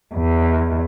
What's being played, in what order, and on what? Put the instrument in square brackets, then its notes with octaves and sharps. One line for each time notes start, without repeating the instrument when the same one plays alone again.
[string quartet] E2